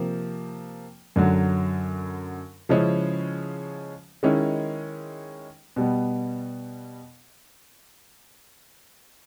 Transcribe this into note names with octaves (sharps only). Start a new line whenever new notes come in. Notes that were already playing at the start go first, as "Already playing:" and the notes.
Already playing: C3 F3 A#3
F#2 D3 F#3
C#3 F3 G#3 C#4 E4
D#3 G#3 C#4 E4
B2 G3 B3